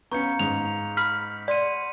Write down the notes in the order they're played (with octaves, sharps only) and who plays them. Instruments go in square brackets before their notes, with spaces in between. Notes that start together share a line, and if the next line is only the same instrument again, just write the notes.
[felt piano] B3 C#4 [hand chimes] F5 A#5 [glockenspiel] C#6 G6 C#7
[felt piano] G#2 [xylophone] F7
[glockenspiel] B5 B6 [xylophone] F6
[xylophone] D5 [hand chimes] F#5 C6 C#7 [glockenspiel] B6 D#7